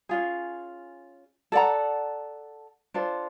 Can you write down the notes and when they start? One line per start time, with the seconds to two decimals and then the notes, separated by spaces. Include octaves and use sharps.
0.09 C#4 F4 G#4
1.52 A4 D5 F#5 A#5
2.94 D4 F4 A4 C5